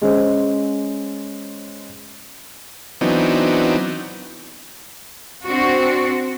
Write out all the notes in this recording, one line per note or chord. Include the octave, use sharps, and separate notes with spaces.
G#3 C#4 C5
E3 F#3 B3 C4 D4 D#4
C4 D4 F#4